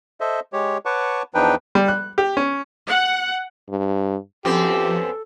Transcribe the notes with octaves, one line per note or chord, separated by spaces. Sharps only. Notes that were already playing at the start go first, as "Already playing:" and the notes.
A4 C5 D#5 E5
G#3 G4 C#5
B4 C#5 F#5 A5 C#6 D6
E2 F3 D4 D#4 B4 G5
G3
F#6
G4
C#4
F#5
G2
F#2 F3 B3 C4 G4 A4